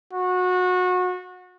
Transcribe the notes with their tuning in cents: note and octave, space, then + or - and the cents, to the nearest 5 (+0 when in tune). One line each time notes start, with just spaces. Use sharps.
F#4 -25